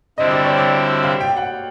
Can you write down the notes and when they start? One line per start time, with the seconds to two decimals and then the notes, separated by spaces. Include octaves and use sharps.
0.18 D3 G3 C4 E4 D#5
0.31 D5
0.44 C#5
0.57 D5
1.03 F5
1.20 G5
1.37 F#5